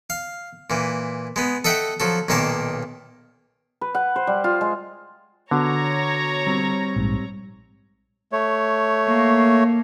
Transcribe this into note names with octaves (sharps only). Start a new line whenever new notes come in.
F5
A#2 E3
G#3 B3
A4 D#5 E5 F#5 G5
F3 F#3 A4
B1 A#2 D#3 A#3 C#5 A5
B4
F#5
C5
G3
F4
G#3
D3 B3 F#4 C#5 A#5
G3 C4
A#1 G#2
A3 C#5
A#3